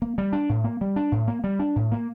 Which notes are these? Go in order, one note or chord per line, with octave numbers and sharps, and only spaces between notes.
A#3
G3
D4
A2
A#3
G3
D4
A2
A#3
G3
D4
A2
A#3